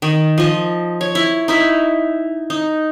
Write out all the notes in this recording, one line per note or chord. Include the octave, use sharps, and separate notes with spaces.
D#3
F3 D#5
C#5
E4
D#4 E4 E5
D#4